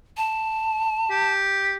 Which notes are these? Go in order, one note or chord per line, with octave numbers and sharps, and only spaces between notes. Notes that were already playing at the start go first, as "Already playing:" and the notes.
A5
G4